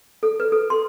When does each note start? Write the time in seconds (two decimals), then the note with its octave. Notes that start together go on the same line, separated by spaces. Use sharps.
0.23 A4
0.40 B4
0.52 A4
0.70 C6